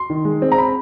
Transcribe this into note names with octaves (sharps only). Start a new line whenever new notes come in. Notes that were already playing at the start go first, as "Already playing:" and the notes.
Already playing: C6
D#3
G#3
C4
A#5
B5